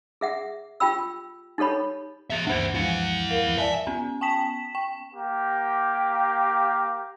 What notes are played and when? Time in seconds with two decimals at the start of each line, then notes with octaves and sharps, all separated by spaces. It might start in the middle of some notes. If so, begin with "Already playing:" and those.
0.21 G#4 E5 F#5
0.80 F4 G4 G5 B5 E6
1.58 D#4 G4 A4 C#5 B5
2.30 G#4 E5
2.47 D2 G2 E3 D4 C5
2.75 F3 G#3 E4 F#5
3.29 A#4 F5
3.58 D5 E5 G#5 A5
3.87 B3 C#4
4.21 G5 A5 B6 E7
4.75 G5
5.14 A#3 G4